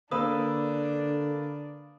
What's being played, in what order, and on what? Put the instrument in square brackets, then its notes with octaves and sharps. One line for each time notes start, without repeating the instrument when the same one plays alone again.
[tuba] D3 [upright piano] A#3 B4 E6 [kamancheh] D4 D5 [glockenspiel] D#6